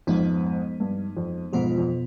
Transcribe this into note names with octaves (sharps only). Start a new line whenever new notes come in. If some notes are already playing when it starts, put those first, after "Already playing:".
F2 G#2 F3 G#3 B3 D#4
G2
F2
F2 G#2 B2 B3 F4
F2